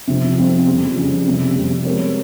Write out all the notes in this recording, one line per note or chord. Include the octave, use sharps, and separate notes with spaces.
C3 F3 C4
C3 F3 C4
F2 C#3 G3
F2 C#3 G3
F2 C3 G3 C4
F2 C3 G3 C4
G#3 C4 G4 A#4 C#5